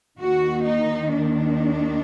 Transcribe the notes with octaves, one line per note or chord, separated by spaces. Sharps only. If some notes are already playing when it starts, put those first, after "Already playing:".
D#2 D#3 F#4
D#4
D4